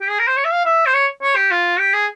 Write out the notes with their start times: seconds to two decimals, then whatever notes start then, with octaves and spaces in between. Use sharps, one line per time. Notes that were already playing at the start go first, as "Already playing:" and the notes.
0.01 G4
0.10 G#4
0.19 A#4
0.28 C5
0.37 C#5
0.45 E5
0.52 F5
0.65 E5
0.86 C5
0.94 C#5
1.23 C#5
1.36 G4
1.51 F4
1.79 G4
1.94 G#4